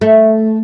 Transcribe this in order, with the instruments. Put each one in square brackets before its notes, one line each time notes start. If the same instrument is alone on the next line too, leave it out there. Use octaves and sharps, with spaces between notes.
[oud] A3